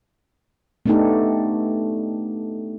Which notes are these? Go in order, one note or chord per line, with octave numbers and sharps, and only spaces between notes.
A3 B3 D4 D#4 G4 A4